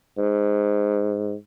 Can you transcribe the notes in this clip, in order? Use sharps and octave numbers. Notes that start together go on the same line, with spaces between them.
G#2